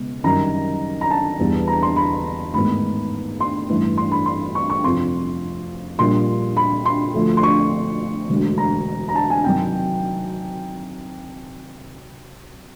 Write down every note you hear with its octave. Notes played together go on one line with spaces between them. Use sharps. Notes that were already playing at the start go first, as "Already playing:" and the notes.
Already playing: C#2 B2
F#2 D#3 G3 A#5
A#5
A5
E2 B2 G3 B3
A#5
C6
B5
A1 G#2 D#3 G#3 B3 B5
C6
A1 G2 E3
C6
B5
C6
C#6
C#6
F2 C3 F3 C6
A#1 A#2 G3 A#3 C6
B5
C6
D2 D3 F3 A3
C6
C#6
E1 D2 D3
A#5
A#5
A5
G#5
C3 D#3 F#3 G5